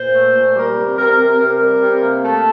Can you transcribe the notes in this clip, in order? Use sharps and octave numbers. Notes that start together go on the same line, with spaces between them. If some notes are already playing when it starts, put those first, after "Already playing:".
Already playing: A#2 C5
A3
A#2
G3 A#4
C3
C3 A#4
C3
C3 A#4
G3
C3
A#3
A3 A4